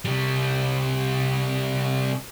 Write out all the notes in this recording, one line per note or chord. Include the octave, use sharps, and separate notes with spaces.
C3 G3